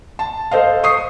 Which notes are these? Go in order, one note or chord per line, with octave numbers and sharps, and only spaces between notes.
A5
A4 C5 D#5 F5
C#6 D#6 C7